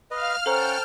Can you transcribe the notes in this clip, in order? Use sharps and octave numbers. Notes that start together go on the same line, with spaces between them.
B4 D#5 F5 F6
C#4 A4 C5 F#5 G5 A5 A#5 G6